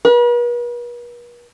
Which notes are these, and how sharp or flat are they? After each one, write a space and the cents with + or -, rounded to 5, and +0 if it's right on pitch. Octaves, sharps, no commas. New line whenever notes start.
B4 -45